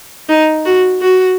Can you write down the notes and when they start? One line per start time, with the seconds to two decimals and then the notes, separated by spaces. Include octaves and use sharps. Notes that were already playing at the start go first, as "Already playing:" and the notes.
0.29 D#4
0.65 F#4
1.01 F#4